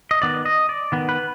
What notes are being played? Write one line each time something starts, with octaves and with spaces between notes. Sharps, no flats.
D#5
D#3 B3 D5
D#5
D5
D#3 B3
B4